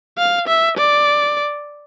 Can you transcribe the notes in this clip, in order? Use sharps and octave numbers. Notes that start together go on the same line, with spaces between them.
F5
E5
D5